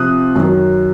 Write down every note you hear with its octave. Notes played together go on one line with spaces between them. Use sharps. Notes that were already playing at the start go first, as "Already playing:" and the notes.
Already playing: C3 F3 C4 D#6 F#6
F#2 D#3 F#3